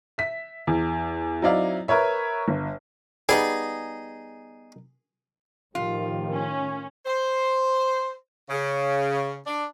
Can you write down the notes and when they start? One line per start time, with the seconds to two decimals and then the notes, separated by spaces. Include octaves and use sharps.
0.18 E5 B6
0.67 E2
1.42 F#3 C4 D#4 E4 D5 F5
1.88 A#4 B4 C#5 E5
2.48 G1
3.29 G3 B3 D#4 G#4
5.75 A2 D#3 F3 F4 G4
6.33 C#4
7.06 C5
8.50 C#3
9.46 D4